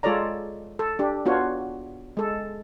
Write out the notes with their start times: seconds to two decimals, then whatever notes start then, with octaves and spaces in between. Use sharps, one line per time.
0.03 G#3 F4 A4 C#5 D5 A#5
0.79 A4
0.99 D4 G4
1.25 B3 D4 F4 F#4 C#5
2.17 G#3 A4